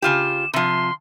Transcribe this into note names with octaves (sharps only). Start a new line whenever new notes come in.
C#3 F4 G4 E7
C3 F3 C6